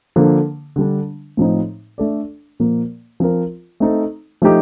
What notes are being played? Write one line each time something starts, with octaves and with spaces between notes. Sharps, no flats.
D3 F3 A#3
D3 G3 D4
A2 F3 C4 D#4
A3 D4 A4 D5
A#2 F3 A#3
F3 C4 F4 A#4
A3 C4 D#4 A4
F3 A3 D#4 G4